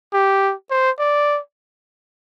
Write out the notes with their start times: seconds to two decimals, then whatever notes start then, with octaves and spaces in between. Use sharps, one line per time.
0.13 G4
0.70 C5
0.99 D5